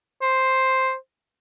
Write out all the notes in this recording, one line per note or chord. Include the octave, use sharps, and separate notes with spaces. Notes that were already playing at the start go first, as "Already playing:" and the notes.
C5